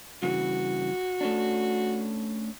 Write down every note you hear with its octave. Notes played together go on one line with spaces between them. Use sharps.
G2 C#3 E3 F#4
A3 C#4 D4